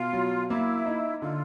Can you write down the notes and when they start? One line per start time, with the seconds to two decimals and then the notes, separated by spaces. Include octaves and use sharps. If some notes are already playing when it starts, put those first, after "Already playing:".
Already playing: B2 F4
0.13 F#3
0.49 A#3 E4
0.85 D#4
1.21 D3 F4